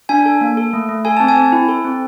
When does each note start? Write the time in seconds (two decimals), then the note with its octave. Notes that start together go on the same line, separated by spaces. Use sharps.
0.09 D4 G#5
0.26 A4
0.41 A#3
0.57 A4
0.73 A3
0.89 A3
1.05 A4 G#5
1.17 C4 A5
1.28 G#5
1.36 C4
1.52 E4
1.69 A4
1.84 C4